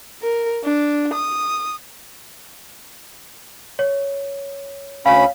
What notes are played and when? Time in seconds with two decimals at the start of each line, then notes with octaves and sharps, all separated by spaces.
0.22 A#4
0.64 D4
1.13 D#6
3.79 C#5
5.06 D2 C#4 C#5 F5 B5